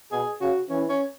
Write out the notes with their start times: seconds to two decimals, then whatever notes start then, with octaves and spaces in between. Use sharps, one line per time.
0.12 B2 G#4
0.41 C#3 F#4
0.69 E3 C#4
0.89 C#4